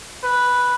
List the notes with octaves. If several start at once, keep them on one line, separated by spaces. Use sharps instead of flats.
B4